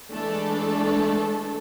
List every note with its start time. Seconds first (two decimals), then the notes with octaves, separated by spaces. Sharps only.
0.11 E3 G#3 A3 D4 A4